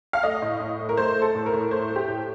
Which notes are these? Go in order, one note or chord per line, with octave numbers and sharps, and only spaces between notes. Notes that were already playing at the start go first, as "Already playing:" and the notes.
F5
A3 D#5
A2
A2
A3
A#4
A3 C5
A3
A4
A2
A#4
A2
A3 C5
A3
G4
A2